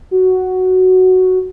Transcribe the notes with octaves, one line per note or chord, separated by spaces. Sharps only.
F#4